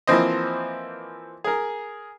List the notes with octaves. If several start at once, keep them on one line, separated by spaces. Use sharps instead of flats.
E3 F3 A#3 C4 C5 D#5
G#4 A#4